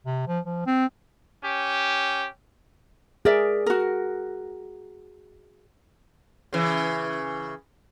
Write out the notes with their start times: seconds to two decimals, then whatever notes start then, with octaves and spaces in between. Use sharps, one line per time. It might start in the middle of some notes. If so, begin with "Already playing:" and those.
0.06 C3
0.27 F3
0.45 F3
0.67 C4
1.43 C#4 G4
3.25 G#4 A#4 D5 E5
3.66 F#4 A#4
6.53 C#3 E3